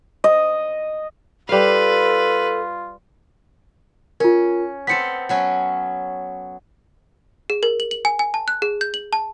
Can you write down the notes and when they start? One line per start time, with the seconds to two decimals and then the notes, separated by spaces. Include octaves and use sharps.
0.24 D#5
1.49 G3 F4 A4 B4 F5
4.20 C#4 F4 A#4
4.87 B3 C4 A4 B6 C#7
5.29 F#3 B3 C#4
7.50 G#4
7.63 A#4
7.80 F#7
7.91 F#7
8.05 G#5
8.19 G#5
8.34 A5
8.48 F#6
8.62 G#4
8.81 G6
8.94 F#7
9.13 A5